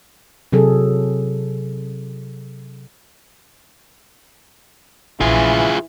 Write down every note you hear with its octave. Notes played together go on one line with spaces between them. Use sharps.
C3 F#3 G#4 A4
A#1 E3 F4 G#4